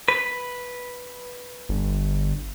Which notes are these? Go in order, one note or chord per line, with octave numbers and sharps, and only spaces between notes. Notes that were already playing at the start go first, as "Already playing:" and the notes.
B4
G1